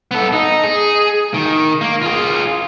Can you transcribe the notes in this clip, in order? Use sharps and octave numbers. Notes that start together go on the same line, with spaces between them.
B3 A4
D#4
G#4
D#3
A#3
F4 G#4